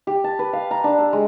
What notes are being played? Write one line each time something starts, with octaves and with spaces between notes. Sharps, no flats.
G4
A5
B4
F5
A#5
D4
E6
G#3